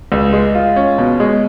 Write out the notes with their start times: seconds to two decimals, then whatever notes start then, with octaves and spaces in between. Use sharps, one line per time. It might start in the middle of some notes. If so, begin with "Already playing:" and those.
0.12 C#2
0.33 G#3
0.55 F4
0.76 C#4
0.98 B2
1.20 G#3